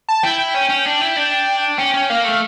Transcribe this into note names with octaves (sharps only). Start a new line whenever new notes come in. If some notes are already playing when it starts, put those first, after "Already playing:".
A5
E4 G5
G5
C#4
C#4
D4
E4
D4
C#4 G5
C#4
A#3 F5
A3